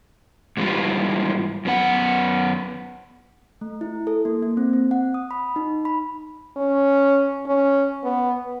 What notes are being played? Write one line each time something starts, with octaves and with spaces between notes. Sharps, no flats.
G#2 E3 G3 F4
F#2 B3 F#5
A3
E4
A4
A#3
A#3
C4
C4
F#5
D#6
B5
D#4
B5
C#4
C#4
B3